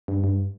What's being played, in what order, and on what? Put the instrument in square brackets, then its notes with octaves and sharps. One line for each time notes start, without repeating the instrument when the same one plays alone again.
[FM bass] G2
G2